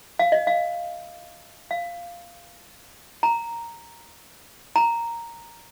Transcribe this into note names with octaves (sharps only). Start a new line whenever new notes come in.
F5
D#5
F5
F5
A#5
A#5